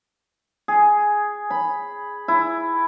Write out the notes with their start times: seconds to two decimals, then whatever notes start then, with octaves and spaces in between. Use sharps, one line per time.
0.68 G#4
1.50 B5
2.28 E4